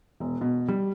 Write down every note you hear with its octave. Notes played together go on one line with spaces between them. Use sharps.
E1
B2
G3